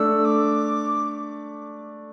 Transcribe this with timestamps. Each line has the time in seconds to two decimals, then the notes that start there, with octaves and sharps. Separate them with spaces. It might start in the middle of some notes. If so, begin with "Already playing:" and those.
Already playing: A3 D4 E6
0.24 D6